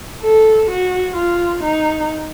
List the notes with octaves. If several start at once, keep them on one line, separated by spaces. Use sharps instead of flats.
A4
F#4
F4
D#4